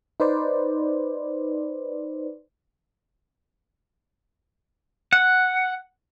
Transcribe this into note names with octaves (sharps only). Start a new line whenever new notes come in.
D#4 B4 C5 D5
F#5